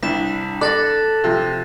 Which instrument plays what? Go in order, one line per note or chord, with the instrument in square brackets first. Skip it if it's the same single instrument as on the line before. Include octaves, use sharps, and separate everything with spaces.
[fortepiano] C2 [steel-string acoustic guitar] D4 [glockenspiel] B6 E7
[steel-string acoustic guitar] A4 [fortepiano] D5 [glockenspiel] F#6 A6 A#6
[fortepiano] C3 F3